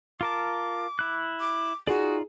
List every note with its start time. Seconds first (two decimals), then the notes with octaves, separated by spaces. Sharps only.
0.21 F4 A#4 A5 D6
0.99 E4 F#6
1.40 D6
1.87 D#4 F4 F#4 G#4 D5